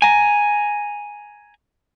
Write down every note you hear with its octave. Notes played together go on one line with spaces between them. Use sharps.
G#5 A#5